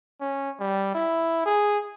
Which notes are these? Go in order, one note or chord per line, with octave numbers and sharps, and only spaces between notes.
C#4
G3
E4
G#4